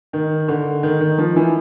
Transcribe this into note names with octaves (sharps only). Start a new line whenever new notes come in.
D#3
D3
D#3
D#3
F3
E3